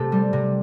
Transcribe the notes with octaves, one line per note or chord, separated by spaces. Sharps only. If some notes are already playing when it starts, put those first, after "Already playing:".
Already playing: C3 A3 G4 A4
G3
C3